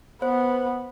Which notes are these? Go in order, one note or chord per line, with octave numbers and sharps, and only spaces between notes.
B3 B4 C5